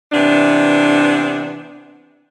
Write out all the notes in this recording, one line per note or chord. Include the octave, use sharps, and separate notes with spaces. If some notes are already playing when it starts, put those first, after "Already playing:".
C3 E3 B3 D4